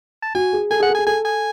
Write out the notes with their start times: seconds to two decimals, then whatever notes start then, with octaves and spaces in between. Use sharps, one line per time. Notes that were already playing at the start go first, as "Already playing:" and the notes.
0.22 A5
0.35 F#4 G#5
0.53 G#4
0.71 A4 G#5
0.80 G#4 F#5
0.89 A4
0.95 G#5
0.98 G#4
1.06 A4 G#5
1.25 G#5